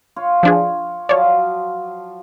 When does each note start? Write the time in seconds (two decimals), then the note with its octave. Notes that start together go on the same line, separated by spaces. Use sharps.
0.16 F4 C#5
0.43 F3 D4 G#4
1.09 F3 F#3 C#5 D5 F5